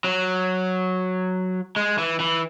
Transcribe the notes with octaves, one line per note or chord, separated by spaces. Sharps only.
F#3
G#3
E3
E3